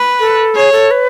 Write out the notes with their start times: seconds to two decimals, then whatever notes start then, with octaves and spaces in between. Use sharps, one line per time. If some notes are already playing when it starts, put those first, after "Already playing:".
Already playing: B4
0.20 A4
0.55 G#4 C#5
0.72 A4
0.91 B4